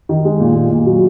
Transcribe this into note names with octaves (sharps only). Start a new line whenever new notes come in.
D#3
G#3
A#2
A#2
A#2
F#3